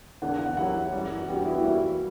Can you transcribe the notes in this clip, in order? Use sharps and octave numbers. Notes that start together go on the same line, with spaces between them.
E2 D3 A#3 D4 F#5
F#5
F#3 A#3 C#4 E4 G4 F#5
F#2 E3 G3
F#4
E3 B3 D4 G4
F#4
E4
F#4
E3 G3 A#3 E4